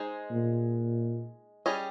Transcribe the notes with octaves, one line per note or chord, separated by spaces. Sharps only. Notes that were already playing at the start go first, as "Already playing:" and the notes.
Already playing: G#3 D#4 G#4 C5
A#2
G3 C#4 G#4 D#5